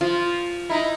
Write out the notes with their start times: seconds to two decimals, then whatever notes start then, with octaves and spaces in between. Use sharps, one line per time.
0.01 F3 F4
0.70 D#4 E4